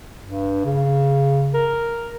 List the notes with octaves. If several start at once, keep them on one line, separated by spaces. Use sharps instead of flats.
G2
C#3
A#4